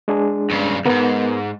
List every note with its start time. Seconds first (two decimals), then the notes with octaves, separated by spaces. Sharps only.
0.08 G#3 D4 G#4
0.51 G2 C#3
0.86 D2 G#2 B3 A#4